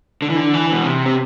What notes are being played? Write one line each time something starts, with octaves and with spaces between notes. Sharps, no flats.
D3
E3
D3
E3
B2
C3
C4